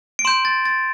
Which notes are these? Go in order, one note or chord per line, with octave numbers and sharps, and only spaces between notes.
D7
C6 G6 E7
A6
A6